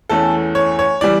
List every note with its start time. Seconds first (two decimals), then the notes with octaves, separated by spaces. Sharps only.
0.09 E2 E3 A3 C#4 A4
0.55 C#5
0.79 C#5
1.01 E3 G3 D5